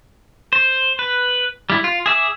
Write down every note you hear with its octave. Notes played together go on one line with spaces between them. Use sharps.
C5
B4
G3 E4
F4
G#4 E5 D6